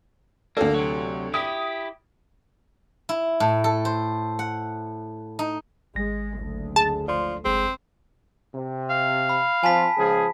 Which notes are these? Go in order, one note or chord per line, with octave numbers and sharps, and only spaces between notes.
D2 A#3 A4
C3 F#3
E4 G4 D#6
E4
A2
A4
C5
F#5
D#4
G#1 G#3 A#6
F#1 D2
G#4 A5
F3 D5 C6
G1 G#3 C4 G#4
C3
F5
B5
F3 C4 F4 G#5 A5 B6
C#2 F3 G#4